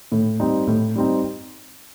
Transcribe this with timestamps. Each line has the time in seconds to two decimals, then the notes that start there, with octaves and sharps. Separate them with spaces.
0.12 A2
0.40 G3 C4 D#4
0.67 A2
0.95 G3 C4 D#4